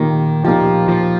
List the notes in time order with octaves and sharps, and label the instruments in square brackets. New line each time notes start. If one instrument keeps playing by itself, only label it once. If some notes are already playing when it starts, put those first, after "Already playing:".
Already playing: [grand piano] A#2 A#3 D#4 G4 [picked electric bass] D#3
[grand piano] A#2 A#3 D#4 G4 [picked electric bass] F3
[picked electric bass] F3